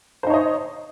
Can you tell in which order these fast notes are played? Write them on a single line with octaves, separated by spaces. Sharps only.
C5 D#4 C#5 D#5